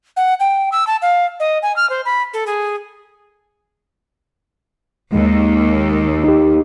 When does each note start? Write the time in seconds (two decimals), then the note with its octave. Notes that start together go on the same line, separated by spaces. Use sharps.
0.17 F#5
0.40 G5
0.72 E6
0.87 A5
1.02 F5
1.40 D#5
1.63 G#5
1.76 F6
1.90 C5
2.05 B5
2.34 A4
2.46 G#4
5.13 D#2 G#3
6.24 D#4 G4